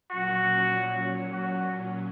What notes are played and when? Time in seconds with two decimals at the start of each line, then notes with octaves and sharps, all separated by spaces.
0.11 A#2 F#3 C#4 F#4
1.32 F#4